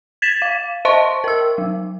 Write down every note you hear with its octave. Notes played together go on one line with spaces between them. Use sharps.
G#6 A6 B6 E7
F5
C5 D#5 E5 A5 C6 C#6
A#4 E6
F#3